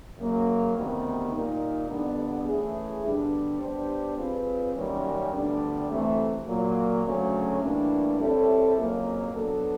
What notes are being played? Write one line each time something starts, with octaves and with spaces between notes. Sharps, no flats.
F#2 C#3 F#3 A#3
D2 C3 D#3 G3 B3
A#2 G3 A#3 D#4
F2 D3 G3 B3 D4
E3 A3 C#4 E4 G#4
G2 D3 G3 B3 D4
G3 B3 D4 G4 C5
G3 C4 F4 G#4 B4
F#2 D#3 G3 A#3 C#4
D2 D3 G3 B3 D4
D2 C3 E3 A3
A#2 F#3 A#3
D2 C#3 F#3 A3 C#4
A2 E3 G3 A#3 D4
G3 C4 E4 A4 C#5
F2 C#3 F#3 A#3 C#4
F#3 B3 D4 F#4 A4